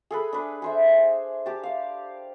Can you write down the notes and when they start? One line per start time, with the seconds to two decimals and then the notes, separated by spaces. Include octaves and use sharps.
0.11 G#4 A4 B4
0.33 D4 B4
0.62 G#4 C5 E5
1.46 G4 A5
1.63 F5